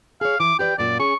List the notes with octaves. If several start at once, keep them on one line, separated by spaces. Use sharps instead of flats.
G#4 C#5 F5
E3 D6
G4 B4 D5 G5
F#2 A#2 A#3 D5
C#4 G#4 C#6